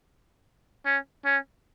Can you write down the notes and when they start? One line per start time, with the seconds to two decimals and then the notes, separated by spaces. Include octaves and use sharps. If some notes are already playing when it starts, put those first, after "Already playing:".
0.86 C#4
1.25 C#4